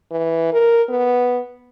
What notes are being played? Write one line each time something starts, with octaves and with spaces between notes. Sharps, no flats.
E3
A#4
B3